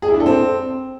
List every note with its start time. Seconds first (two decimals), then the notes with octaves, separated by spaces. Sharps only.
0.02 G#4
0.08 E4
0.14 D4
0.20 A4
0.26 C4